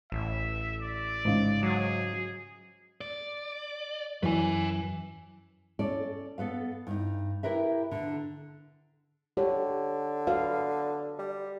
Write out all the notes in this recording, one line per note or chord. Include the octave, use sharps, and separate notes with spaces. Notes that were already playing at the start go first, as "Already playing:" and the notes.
A1 E5
D5
G#2 C#3
F#3 G#4
D5
F#2 E3 B4 G#5
C#4 A4 D5
B3 A4 B4 F5
G2 D#4
E4 G4 A#4 B4 E5
D3
D3 G4 C#5
F#4 B4 F5
G3